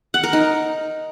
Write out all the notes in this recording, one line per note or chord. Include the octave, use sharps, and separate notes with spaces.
F#5
A#4
D#4